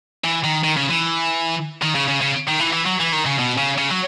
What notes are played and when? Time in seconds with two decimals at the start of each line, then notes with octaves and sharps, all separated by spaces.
0.24 E3
0.44 D#3
0.64 D#3
0.77 C#3
0.90 E3
1.82 D#3
1.95 C#3
2.08 C#3
2.21 C#3
2.47 D#3
2.59 E3
2.72 E3
2.86 F#3
3.00 E3
3.12 D#3
3.26 C#3
3.39 B2
3.58 C#3
3.78 C#3
3.91 F#3